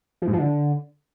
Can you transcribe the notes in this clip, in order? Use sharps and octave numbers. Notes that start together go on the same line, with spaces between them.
F3
G#2
F3
D3